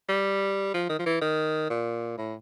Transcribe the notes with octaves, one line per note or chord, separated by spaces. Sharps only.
G3
F3
D#3
F3
E3
D#3
A#2
A2